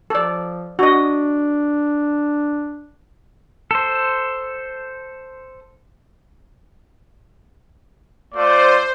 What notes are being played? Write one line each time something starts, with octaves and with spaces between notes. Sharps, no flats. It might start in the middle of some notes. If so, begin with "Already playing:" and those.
F3 A4 D5
D4 F#4 D#5
A4 C5
A3 F4 C5 D5